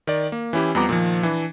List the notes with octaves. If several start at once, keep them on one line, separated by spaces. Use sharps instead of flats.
D#3 D5
A#3
E3 C#4 E4 G4
F2 F3 G3 B3 A#5 D6
A#2 D#3 F3
E3 D4